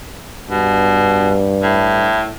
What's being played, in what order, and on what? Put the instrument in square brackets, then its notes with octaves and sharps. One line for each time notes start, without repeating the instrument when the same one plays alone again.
[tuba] G2 [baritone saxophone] B2
[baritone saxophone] A2